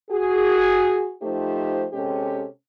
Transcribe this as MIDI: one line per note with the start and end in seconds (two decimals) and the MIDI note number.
0.10 1.12 66
0.10 1.12 68
1.22 1.85 53
1.22 1.85 57
1.22 1.85 63
1.22 1.85 67
1.22 1.85 72
1.93 2.46 48
1.93 2.46 56
1.93 2.46 61
1.93 2.46 67
1.93 2.46 69